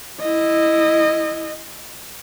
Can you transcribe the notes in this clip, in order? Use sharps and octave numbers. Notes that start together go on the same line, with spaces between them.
E4 D#5